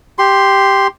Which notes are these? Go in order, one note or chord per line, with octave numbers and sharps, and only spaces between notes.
G4 C6